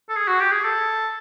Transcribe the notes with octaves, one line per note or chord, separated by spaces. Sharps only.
A4
G#4
F#4
G4
G#4
A4